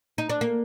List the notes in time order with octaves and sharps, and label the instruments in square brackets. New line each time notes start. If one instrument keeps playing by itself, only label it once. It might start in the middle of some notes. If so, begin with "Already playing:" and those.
[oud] D#4
D4
A#3